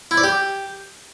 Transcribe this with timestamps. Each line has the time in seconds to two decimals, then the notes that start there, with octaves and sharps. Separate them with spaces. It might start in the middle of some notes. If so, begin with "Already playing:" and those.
0.11 E4
0.17 D5
0.24 G4